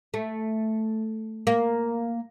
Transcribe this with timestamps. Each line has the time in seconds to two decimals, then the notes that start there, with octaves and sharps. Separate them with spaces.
0.14 A3
1.47 A#3